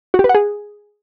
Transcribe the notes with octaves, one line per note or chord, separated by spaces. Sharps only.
F#4
G4
B4
F#5
G#4